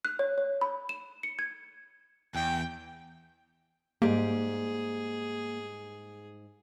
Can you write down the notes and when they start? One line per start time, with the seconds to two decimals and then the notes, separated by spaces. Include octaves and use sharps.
0.05 F#6
0.19 C#5
0.38 C#5
0.61 B5
0.89 E7
1.23 C#7
1.39 G#6
2.35 E2 G5
4.02 G#2 G3 A#3 G4 G#4